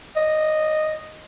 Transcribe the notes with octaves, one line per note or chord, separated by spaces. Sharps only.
D#5